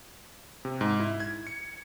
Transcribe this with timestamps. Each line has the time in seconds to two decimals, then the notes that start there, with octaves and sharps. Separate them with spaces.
0.65 C3
0.81 G#2
1.00 E4
1.20 G#6
1.47 C#7